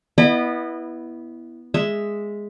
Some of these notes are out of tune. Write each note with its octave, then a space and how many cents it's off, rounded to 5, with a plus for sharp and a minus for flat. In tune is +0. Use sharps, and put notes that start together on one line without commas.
B3 -10 E4 +0 D#5 -40
G#3 -5 E5 +0